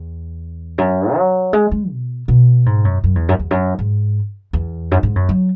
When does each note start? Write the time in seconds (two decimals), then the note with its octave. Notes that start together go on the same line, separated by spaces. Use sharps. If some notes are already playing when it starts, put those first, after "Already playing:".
Already playing: E2
0.78 F#2
1.15 F#3
1.53 G#3
1.71 G#3
1.90 B2
2.28 B2
2.66 G#2
2.85 F#2
3.04 F#2
3.15 E2
3.29 F#2
3.39 E2
3.51 F#2
3.79 G#2
4.53 E2
4.92 F#2
5.03 G#2
5.16 F#2
5.29 F#3